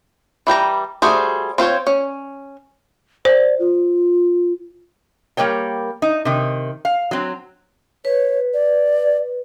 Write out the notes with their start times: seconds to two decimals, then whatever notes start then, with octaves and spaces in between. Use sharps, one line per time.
0.47 E3 G3 G5 A#5
1.02 G3 A3 F#4 G#4 C5
1.58 C4 F4 C5 C#5
1.87 C#4
3.25 C5 D5
3.59 F4
5.37 G3 A#3 A#4 C#5 G5
6.02 D#4
6.25 C3 D#3
6.85 F5
7.11 F#3 C4
8.05 B4 C#5
8.54 D5